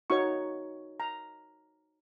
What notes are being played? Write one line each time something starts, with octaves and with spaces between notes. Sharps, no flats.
D#4 F#4 C#5 C#6
A#5